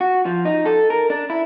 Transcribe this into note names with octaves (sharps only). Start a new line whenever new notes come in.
F#4
F3
D#4
A4
A#4
D4
E4